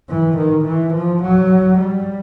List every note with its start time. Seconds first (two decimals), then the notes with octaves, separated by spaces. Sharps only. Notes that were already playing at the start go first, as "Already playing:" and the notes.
0.10 E3
0.37 D#3
0.65 E3
0.93 F3
1.22 F#3
1.78 G3